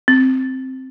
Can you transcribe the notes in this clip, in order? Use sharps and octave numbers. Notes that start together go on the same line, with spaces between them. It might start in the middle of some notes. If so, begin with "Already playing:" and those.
C4